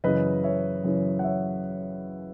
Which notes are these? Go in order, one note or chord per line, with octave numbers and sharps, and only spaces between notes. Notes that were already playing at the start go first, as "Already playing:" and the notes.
F#2 C#3 E3 B4 D#5
C#5 E5
F#2 C#3 E3
F#5
C#5 E5